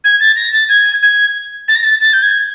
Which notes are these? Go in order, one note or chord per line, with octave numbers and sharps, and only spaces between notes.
G#6
A6
A#6
A6
G#6
G#6
A6
A#6
A6
A6
G6
G#6